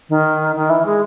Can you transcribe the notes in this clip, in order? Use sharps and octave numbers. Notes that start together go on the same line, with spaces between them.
D#3
D#3
E3
G#3